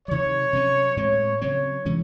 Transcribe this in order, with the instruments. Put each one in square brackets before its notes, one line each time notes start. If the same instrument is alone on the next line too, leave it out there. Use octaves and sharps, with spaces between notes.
[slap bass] C3 D#3 F#3 [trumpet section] C#5
[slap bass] C3 F#3 C#4
[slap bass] A2 G#3 C4 [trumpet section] C#5
[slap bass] C#3 F#3 C4 [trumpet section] C#5
[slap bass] C3 E3 G#3 C#4